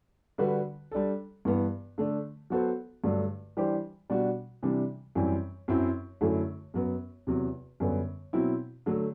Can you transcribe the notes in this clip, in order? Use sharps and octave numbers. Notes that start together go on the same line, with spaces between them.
D3 G3 D4 F#4 B4
G3 D4 A4
G2 E3 B3
D3 A3 D4
F#3 B3 F#4 A4 C5
G2 D3 F#3 A3 D4
E3 G3 D4 G4 C5
B2 G3 D4 F#4
C3 E3 G3 D4
F#2 E3 G3 C4
F#2 F#3 C4 E4
F#2 D3 F#3 A3 E4
F#2 F#3 B3
E2 C3 F#3
F#2 D3 G3 B3
B2 F#3 C4 E4
D3 F#3 A3